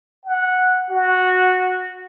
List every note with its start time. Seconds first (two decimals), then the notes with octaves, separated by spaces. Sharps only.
0.25 F#5
0.90 F#4